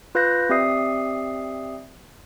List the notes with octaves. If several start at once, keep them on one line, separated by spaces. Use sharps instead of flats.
F4 B4 F5 F#6 G6 A#6
C4 G4 D5 E5 D#6 C7